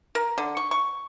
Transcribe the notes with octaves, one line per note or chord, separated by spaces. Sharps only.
A#4
D3
C#6
C#6